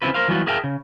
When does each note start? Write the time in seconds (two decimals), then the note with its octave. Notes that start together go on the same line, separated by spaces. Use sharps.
0.02 C#3 C4 E4 F4 B4
0.14 A#4 C5 F5
0.28 E3 F#3 G3 B3 F4 F#4
0.47 G#4 A#4 E5 F5 G5 A5
0.64 C#3